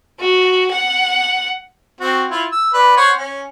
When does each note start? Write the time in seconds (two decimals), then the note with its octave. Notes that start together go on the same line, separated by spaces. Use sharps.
0.20 F#4
0.71 F#5
2.00 C4 F#4
2.30 E4 F4
2.52 E6
2.74 B4 D5
2.97 C5 C#5 F#5
3.17 C#4